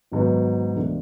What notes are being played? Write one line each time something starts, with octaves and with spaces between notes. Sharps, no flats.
G#1 G#2 F#3 B3
E1 D2 D3 A3 D4